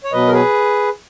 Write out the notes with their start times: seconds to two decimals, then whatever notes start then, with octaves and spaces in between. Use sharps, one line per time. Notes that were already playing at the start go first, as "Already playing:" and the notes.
0.04 C#5
0.12 B2 F#3 B4 D#5
0.28 A#4
0.33 G#4 B4